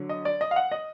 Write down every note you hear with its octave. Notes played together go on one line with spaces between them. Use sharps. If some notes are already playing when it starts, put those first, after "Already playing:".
Already playing: D3 F#3
D#5
D5
D#5
F5
F#5
D#5